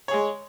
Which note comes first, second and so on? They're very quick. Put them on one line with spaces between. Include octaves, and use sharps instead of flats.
C#5 G#4 G#3